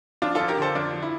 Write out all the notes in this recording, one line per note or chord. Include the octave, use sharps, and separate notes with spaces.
F3 D4 F4
F2 F4 A4
G4 A#4
D3 A4 C5
F2 D4 F4
F3
E4